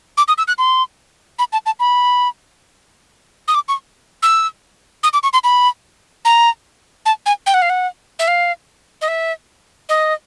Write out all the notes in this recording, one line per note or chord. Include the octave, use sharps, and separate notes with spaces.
D6
D#6
E6
F#6
C6
B5
A5
A5
B5
D#6
D6
C#6
E6
D#6
D6
C#6
C6
B5
A#5
A5
G#5
G5
F#5
F5
F#5
E5
F5
D#5
E5
D#5